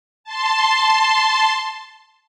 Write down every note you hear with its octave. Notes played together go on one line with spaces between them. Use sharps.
A5 C6